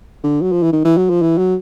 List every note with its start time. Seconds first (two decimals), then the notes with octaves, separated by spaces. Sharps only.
0.24 D3
0.42 F#3
0.52 F3
0.62 E3
0.72 D#3
0.85 E3
0.97 F#3
1.09 F3
1.22 E3
1.38 F#3